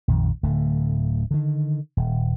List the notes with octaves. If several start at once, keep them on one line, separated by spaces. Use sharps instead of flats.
A#1 F2 D#3
D1 D3 A3
D3 D#3
D#1